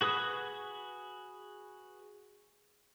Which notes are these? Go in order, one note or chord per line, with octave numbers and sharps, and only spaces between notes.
F#4 G#4 B4 D#6